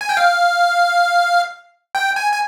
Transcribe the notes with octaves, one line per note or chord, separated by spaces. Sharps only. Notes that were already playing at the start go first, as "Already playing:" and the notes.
G#5
G5
F5
G5
G#5
G#5